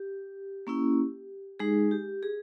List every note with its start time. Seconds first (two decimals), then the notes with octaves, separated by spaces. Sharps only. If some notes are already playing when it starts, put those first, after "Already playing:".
Already playing: G4
0.67 A#3 C#4 E4
1.60 G#3 D#4 G#4
1.91 G4
2.23 G#4